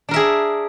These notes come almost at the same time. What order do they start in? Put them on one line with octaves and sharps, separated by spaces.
D4 A#4 E5 G#4